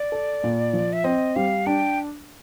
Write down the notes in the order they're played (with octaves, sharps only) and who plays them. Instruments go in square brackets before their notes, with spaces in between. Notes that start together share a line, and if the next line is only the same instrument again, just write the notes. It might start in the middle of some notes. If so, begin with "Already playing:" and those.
Already playing: [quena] D5
[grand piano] A4
A#2
F3
[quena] E5
[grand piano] C4 [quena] D#5
[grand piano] G3 [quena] F5
[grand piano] D4 [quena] G5